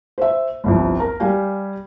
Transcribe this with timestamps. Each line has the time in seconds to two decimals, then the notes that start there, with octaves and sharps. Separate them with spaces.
0.18 C5 E5
0.64 G1 C2 F2
1.00 A#4
1.20 G3 G4 F5 G#5